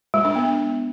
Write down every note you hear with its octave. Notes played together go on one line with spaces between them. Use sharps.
G#3
D4
B3